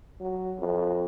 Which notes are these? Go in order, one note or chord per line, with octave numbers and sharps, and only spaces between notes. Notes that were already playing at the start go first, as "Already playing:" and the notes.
F#3
F2